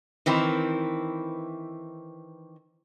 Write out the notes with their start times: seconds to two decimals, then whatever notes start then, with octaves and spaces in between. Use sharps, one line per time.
0.26 D#3 E3 C4 E4